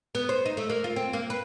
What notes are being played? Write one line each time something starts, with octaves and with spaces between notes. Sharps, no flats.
B3
C5
D#4
A3
A#3
F4
C4
A#3
B4